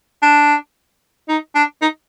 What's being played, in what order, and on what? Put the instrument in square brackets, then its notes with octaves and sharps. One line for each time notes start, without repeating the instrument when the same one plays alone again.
[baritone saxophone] D4
D#4
D4
D#4